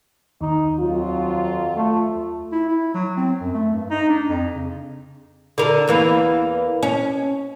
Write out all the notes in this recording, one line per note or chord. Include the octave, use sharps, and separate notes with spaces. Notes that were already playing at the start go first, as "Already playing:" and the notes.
D#2 D#4
F2 F#3 F4
A3
E4
E4
F#3
C4
F#2
A3
G2
D#4
D4
F2
C#3
D3 A#4
E2 E3 A#3
C#4